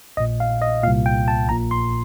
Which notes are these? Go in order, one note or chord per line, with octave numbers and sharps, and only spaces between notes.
A#1 A#2 D#5
F5
D#5
C2 A#2 F5
G5
A5
A#1 A#2 A#5
C6